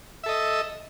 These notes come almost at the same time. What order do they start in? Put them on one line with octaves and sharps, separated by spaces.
E5 A4 D#5